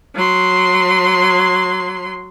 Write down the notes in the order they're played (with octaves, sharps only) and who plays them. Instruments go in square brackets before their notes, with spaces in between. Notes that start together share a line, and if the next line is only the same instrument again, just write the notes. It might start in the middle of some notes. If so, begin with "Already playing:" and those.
[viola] F#3 C6